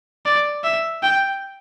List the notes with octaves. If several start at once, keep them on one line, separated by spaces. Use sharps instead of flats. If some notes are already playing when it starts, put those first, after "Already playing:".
D5
E5
G5